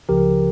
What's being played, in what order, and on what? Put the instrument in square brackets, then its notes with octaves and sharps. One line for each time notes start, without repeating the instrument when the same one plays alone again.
[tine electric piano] C#2 C#3 F3 G4 A#4